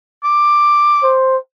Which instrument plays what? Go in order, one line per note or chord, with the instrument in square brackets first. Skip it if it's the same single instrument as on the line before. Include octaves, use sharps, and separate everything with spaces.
[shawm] D6
[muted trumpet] C5